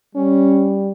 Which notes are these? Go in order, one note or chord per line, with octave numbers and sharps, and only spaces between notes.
G3 C#4